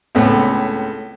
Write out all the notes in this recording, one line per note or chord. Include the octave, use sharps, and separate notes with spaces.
C#2 A2 A3 B3 C4